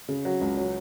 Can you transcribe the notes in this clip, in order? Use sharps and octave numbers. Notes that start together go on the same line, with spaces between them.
C#3
F#3
C#2
F#3